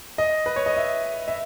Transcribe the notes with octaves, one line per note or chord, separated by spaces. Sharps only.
D#5
B4
C#5
D#5
E5
E5